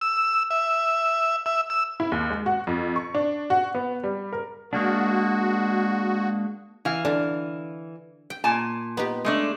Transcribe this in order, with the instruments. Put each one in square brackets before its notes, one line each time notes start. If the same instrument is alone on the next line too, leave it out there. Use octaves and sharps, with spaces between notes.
[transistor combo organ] E6
E5
E5
E6
[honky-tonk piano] E4
D#2
G#3
F#4
F2
C#6
D4
F#4
B3
G3
A#4
[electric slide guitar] G#3 A#3 D4 [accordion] F#4
[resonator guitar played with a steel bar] E3 F5
[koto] D3 D4 A5
G5
[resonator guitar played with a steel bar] A#2 G#5 A5
[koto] B3 D#4 G4
[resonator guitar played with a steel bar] G#3 A3 D4